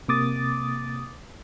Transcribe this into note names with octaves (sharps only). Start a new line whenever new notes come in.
C3 A#3 D6 D#6 A6